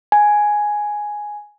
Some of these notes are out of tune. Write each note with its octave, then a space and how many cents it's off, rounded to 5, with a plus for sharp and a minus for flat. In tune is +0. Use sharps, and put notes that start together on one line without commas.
G#5 +5